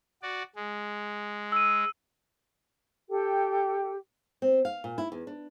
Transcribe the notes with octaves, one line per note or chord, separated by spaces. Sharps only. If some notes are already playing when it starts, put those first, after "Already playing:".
F#4 D5
G#3
E6 D#7
G4 A4 G5
C4
F5
A#2
E4
E2
D4